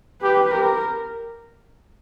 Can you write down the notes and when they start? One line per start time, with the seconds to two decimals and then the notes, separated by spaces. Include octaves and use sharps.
0.22 G4 B4
0.51 G4 A#4